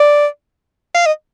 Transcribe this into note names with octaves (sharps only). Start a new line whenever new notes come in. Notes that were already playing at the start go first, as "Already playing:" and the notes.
Already playing: D5
F5
D#5